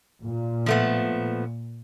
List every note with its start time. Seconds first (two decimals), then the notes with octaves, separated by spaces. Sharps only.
0.25 A#2
0.66 F3 A3 B3